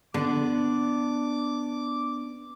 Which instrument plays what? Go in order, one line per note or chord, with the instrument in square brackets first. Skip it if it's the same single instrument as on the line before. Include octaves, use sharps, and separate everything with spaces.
[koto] D3 [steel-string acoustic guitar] B3 D4 [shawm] D6